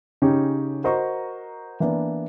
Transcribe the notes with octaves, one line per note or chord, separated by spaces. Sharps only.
C#3 C#4 D#4 G4
F#4 A#4 C5 D#5 A#5 C#6
E3 A#3 B3 D4 E4